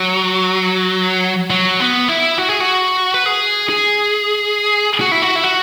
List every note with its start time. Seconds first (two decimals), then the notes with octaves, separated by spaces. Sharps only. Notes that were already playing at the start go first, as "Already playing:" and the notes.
Already playing: F#3
1.50 F#3
1.80 B3
2.08 E4
2.38 F#4
2.49 G#4
2.60 F#4
3.14 B4
3.26 G#4
3.70 G#4
5.00 F#4
5.12 E4
5.22 F#4
5.36 E4
5.44 F#4